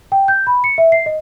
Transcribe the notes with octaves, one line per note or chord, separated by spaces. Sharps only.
G5
G6
B5
C#7
E5
C7
D#5